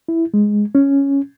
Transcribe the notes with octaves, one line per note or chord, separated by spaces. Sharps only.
E4
G#3
C#4